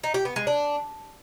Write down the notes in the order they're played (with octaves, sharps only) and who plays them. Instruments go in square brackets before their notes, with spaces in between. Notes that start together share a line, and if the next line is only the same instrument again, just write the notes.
[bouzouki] D#4
G4
B3
G#3
D4